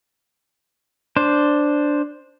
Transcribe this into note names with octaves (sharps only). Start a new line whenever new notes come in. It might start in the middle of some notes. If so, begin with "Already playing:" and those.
D4 C5